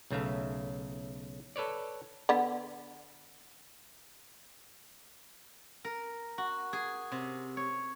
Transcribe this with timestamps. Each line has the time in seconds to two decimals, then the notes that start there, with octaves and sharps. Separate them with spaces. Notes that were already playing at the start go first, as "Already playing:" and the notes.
0.11 B1 C#3 A3 E5 F5
1.56 A4 B4 C#5 D5
2.29 D3 B3
5.84 A#4
6.38 F#4
6.73 G#4
7.12 C3
7.57 C#5